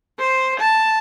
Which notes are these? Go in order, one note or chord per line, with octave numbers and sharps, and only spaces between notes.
C5
A5